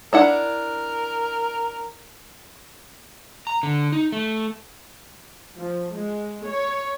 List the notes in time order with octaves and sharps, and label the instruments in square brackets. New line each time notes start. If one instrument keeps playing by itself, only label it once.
[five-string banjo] D4 E4 F#5 [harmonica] A#4
[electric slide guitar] A#5
D3
D#4
A3
[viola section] F3
G#3
C#5